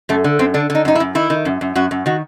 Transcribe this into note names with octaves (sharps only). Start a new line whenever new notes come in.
F#2 A3
D3
F#2 C4
D3 D4
D3
D#4
F#2 D#4
E4
F#2
D#3 E4
D#3
F#2
F#2
F#2 F#4
F#2
D#3 F#4